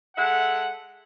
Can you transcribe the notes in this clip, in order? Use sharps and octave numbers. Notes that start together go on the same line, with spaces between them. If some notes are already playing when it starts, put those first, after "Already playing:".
G#3 A4 E5 F#5